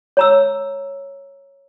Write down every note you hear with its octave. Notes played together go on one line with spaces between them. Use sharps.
C#5 A#5 E6